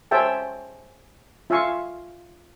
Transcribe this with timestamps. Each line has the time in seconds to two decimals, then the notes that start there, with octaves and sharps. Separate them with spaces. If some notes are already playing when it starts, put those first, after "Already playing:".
0.11 G#4 C5 C#5 E5 G5 A5
1.50 F4 E5 F5 G#5 C#6